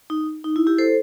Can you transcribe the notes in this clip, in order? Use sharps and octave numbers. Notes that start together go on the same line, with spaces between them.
D#4
D#4
E4
E4 G4
A4 C5